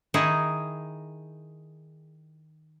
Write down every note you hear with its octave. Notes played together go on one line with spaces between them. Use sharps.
D#3 D#4 E4 G#4